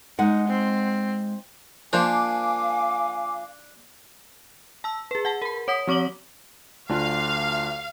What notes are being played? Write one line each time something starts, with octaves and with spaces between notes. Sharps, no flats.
G#3 D#4 F#5
C4
F3 A#3 D4 F5 G#5 D6
A5 E6
G#4 B4
F#5 A5
A#4 B5
C#5 F#5 D#6 B6
F3 C4 D6 F#7 G7
D2 D4 F4 F5